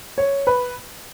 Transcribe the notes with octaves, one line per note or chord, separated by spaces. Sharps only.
C#5
B4